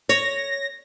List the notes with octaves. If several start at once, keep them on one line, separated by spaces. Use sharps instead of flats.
C#5 A#6